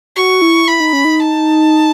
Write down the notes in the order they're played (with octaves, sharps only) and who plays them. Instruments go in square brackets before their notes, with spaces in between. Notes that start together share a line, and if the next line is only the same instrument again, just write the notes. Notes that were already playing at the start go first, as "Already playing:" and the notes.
[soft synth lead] F#4 [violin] C#6
[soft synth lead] E4
[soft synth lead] E4 [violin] B5
[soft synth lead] D#4
C#4
D#4
[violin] A5